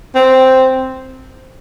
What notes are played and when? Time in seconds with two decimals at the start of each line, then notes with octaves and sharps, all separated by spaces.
0.15 C4